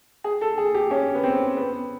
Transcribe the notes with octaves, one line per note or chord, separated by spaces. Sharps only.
G#4
A4
G#4
G4
C#4
B3
C4
B3